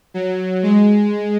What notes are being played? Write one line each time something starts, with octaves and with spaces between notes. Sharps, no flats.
F#3
G#3